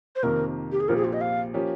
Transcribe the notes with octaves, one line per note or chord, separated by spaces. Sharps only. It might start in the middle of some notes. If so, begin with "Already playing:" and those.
C5
F2 C3 D#3 A#3 A#4
G4
G#4
A#1 A#2 F3 C4 G4 A#4
G#4
F4
D#5
F5
F3 A#3 C#4 G4